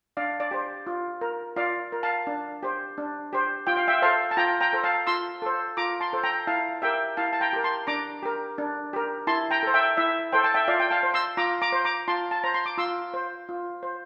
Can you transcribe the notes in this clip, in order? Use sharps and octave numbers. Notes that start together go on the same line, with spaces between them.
D4 D5 F5
D5
G4 C5
F4
A#4
F4 D5 F5
A#4
F5 A5
D4
G4 C5
D4
G4 C5
F4 G5
F5
E5 G5
A4 C5 F5 A5
A5
F4 G5 A#5
G5 A#5
A4 C5
F5 A5
F4 C6 E6
A4 C5
F4 A#5 D6
A5 C6
A4 C5
G5 A#5
E4 F5 A5
G4 A#4 E5 G5
E4 F5 A5
A5
G5 A#5
G4 A#4
A5 C6
D4 A#5 D6
G4 A#4
D4
G4 A#4
E4 A5 C6
G5 A#5
A4 C5
E5 G5
E4 E5
A4 C5 G5
A5
E5 G5
F4 D5 F5
G5
F5 A5
C5
C6 E6
F4 A#5 D6
A#5 D6
C5
A#5 D6
F4 A5 C6
A5
C5 A#5
C6
D6
F4 C6 E6
C5
F4
C5